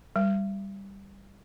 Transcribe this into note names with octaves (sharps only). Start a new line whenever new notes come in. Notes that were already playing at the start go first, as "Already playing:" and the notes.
G3